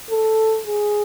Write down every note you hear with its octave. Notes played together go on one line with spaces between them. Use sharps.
A4
G#4